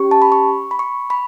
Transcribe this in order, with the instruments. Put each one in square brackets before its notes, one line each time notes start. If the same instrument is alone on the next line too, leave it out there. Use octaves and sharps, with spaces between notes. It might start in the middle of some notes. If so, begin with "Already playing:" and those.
Already playing: [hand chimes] C#4 G4 C#6
A5
B5
C#6
B5
C#6
B5